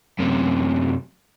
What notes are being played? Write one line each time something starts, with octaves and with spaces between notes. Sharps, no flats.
F#2 C3